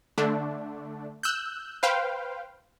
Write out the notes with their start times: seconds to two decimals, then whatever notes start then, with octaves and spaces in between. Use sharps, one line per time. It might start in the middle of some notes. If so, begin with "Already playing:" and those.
0.18 D3 A3 D4
1.23 E6 F#6 G6
1.83 B4 C5 F5 G5